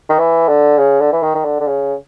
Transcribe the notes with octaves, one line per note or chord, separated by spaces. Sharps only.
D#3
E3
D3
C#3
D3
E3
D#3
D#3
D3
D3
C#3